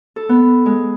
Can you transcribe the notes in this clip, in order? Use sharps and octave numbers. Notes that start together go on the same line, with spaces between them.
A4
B3
G#3